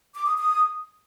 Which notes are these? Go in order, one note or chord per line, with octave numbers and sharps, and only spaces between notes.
D6
D#6
D#6